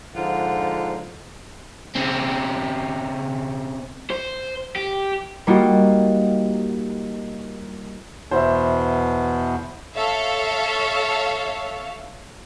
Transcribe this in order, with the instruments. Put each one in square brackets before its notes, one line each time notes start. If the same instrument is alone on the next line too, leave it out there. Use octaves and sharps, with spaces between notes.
[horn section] G#2 D3 F3 F4 F#5
[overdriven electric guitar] C#3 C4
C5
G4
[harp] G3 A#3 D#4 F4 F#4
[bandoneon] E2 B2 B3 [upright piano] C5 E5
[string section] A4 C#5 E5 F5